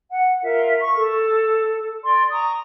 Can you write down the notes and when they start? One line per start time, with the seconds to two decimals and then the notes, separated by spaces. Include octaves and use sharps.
0.12 F#5
0.43 F4 A#4 E5
0.80 C#6
0.97 A4
2.04 D5 C6
2.31 A#5 C#6 D#6